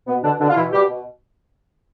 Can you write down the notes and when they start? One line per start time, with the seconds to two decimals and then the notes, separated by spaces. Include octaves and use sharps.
0.08 B2 B3
0.24 B2 D3 D4
0.40 B2 D3 D4
0.49 F4
0.56 B2 E3 E4
0.73 B2 G3 G4
0.89 B2